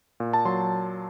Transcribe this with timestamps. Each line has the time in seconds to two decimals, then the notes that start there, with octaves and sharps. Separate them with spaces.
0.20 A#2
0.33 A5
0.45 F#3 C6